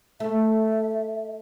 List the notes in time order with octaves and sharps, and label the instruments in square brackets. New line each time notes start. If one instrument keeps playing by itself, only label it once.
[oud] A3 [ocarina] E5